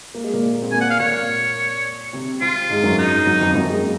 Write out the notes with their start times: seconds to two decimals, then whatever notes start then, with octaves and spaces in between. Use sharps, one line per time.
0.14 A#3
0.24 G#3
0.33 A#2 A#3
0.62 C4
0.71 A#2 A#3 G#5
0.81 F#5
0.90 F5
0.99 A#2 A#3 C#5
2.13 C3 C4
2.41 C3 C4 F4
2.70 G#2 G#3
2.84 F#2 F#3
2.98 D#4
3.26 F#2 F#3
3.40 F2 F3
3.55 F#2 F#3
3.69 G#3
3.77 A#3